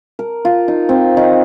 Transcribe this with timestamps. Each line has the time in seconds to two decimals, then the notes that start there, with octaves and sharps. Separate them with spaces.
0.19 A#4
0.45 F4
0.68 D#4
0.89 C4
1.17 D#3